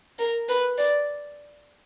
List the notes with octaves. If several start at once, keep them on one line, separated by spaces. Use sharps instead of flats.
A#4
B4
D5